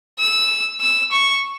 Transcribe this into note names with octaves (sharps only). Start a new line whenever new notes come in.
E6
E6
C#6